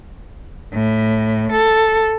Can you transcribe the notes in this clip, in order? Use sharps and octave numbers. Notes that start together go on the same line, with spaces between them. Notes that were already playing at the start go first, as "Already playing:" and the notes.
A2
A4